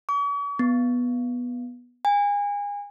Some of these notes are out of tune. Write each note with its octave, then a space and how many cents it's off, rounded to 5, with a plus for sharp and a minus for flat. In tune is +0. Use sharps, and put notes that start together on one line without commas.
C#6 +45
B3 -10
G#5 -30